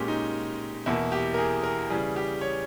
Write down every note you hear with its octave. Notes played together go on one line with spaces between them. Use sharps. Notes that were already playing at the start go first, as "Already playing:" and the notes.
Already playing: A#2 G#3 C#4 G4
D#4
E2 B2 A#3 E4
G4
A#4
G#4
A#4
C#3 E3 G3 G#4
G4
C#5